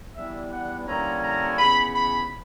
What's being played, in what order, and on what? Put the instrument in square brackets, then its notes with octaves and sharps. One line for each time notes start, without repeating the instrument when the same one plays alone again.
[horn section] E3 G3 B3 D4 E5
F#5
D3 G3 A#3 C#4 E4 A#5
A#5
C#3 E3 B3 B5
B5